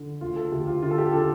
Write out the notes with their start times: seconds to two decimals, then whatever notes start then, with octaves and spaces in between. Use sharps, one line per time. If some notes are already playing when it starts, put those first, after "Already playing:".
Already playing: D3
0.21 D2 F4
0.36 A4
0.52 D2 G4
0.67 F4
0.82 D3 F4
0.91 A4
0.98 G4
1.13 D3 A4